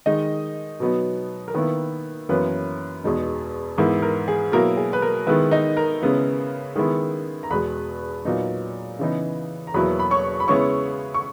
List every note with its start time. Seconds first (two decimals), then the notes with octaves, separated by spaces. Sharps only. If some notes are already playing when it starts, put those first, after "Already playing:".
0.06 D#3 G#3 D#4 D#5
0.80 B2 F#3 B3 D#4
1.48 A#4
1.54 D#3 A#3 B3 E4 B4
2.29 F#2 E3 A#3 B3 C#4 B4
3.04 E2 B2 G#3 D#4
3.78 G#2 E3 B3 E4 A#4
4.02 A#4
4.28 G#4
4.52 B2 F#3 A#3 E4 A#4
4.77 G#4
4.93 B4
5.02 A#4
5.27 D#3 G#3 B3 E4 B4
5.51 D#4 D#5
5.77 A#4 A#5
6.02 C#3 G#3 B3 E4
6.76 D#3 G#3 B3 E4
7.43 A#5
7.50 E2 B2 G#3 B4 B5
8.25 A#2 F#3 B3 D#4
8.99 C#3 E3 B3 D#4
9.67 A#5
9.74 E2 B2 F#3 A#3 E4 B4 B5
10.00 B5
10.11 C#5 C#6
10.40 B5
10.48 C#3 G#3 B3 E4 C#5 C#6
11.14 C#6